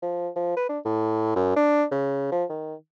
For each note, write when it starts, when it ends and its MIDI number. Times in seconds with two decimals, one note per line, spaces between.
0.02 0.29 53
0.36 0.56 53
0.57 0.65 71
0.69 0.79 62
0.85 1.33 45
1.36 1.52 42
1.56 1.84 62
1.91 2.29 49
2.32 2.44 53
2.50 2.74 51